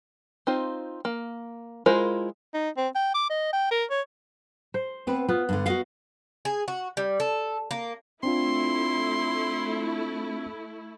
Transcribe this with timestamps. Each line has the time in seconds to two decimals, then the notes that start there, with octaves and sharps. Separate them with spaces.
0.47 C4 D#4 F4 C5
1.05 A#3
1.86 G#3 E4 F4 A#4 C5
2.54 D#4
2.77 C4
2.95 G5
3.14 D6
3.30 D#5
3.53 G5
3.71 A#4
3.90 C#5
4.74 C5
5.07 B3 C4 B4
5.29 B3 F4
5.49 G2 D3
5.66 F#4 D#5 F5
6.45 G#4
6.68 F#4
6.97 G3
7.20 A4
7.71 A#3
8.23 A3 C4 D4 E4 F4 C6